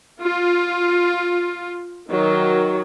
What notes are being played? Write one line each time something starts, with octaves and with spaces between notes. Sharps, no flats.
F4
D#3 F#3